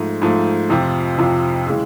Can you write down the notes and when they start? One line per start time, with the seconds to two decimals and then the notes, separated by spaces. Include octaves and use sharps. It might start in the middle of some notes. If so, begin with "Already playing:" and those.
Already playing: G#2 F3 A3
0.22 G#2 F3 A3
0.70 F2 C3 F3
1.18 F2 C3 F3
1.67 C#3 E3 G#3